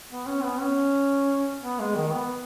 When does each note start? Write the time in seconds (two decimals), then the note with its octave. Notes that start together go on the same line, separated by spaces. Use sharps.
0.10 B3
0.27 C#4
0.43 B3
0.60 C#4
1.62 B3
1.79 G#3
1.96 D#3
2.13 B3